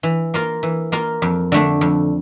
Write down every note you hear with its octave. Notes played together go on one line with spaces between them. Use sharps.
E3
A#3 F4 A#4
E3
A#3 F4 A#4
F2
D3 A3 D4
F2